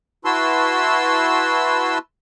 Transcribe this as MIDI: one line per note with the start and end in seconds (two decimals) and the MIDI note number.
0.25 1.98 64
0.25 1.98 66
0.25 1.98 71
0.25 1.98 81
0.25 1.98 84
0.25 1.98 88